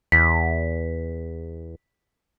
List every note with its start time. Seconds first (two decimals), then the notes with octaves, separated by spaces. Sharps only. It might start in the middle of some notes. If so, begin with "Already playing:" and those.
0.12 E2 B6